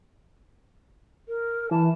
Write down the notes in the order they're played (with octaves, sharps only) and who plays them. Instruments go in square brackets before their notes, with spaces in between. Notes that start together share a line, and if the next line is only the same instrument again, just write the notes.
[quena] A#4
[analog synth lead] E3 [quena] A5